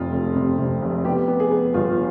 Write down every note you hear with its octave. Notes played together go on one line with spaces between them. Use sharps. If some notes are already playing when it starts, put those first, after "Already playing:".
Already playing: F1 F2 F4
F1
C3
C3
F1
B3 G4
B3
G#4
B3
G1 F4